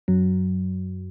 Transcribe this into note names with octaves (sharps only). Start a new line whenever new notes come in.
F#2 F#3